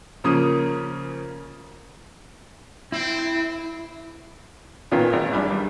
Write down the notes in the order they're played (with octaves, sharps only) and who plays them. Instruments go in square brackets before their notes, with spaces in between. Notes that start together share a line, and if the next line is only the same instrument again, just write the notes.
[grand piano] C#3 F3 A#3 C#4 D#6
[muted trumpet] C4 [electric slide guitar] E4
[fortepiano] A#2 D#3 B3 C#4 F4
G#1
A#1 G2 D4 G#4 B5
G3